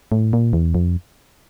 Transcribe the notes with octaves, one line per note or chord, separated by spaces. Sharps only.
A2
A#2
E2
F2